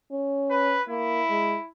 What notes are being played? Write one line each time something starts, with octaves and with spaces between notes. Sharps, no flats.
C#4
B4
A#3 E4
G#3